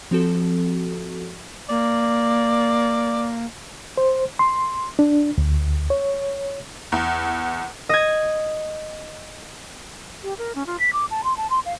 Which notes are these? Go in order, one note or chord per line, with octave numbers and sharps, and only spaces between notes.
F3 C4 F#4 A4
A#3 D5
C5
C6
D4
D2
C#5
E2
D#5 G#6
G4
A#4
C#4
F4
B6
D6
A5
C6
A5
C6
F5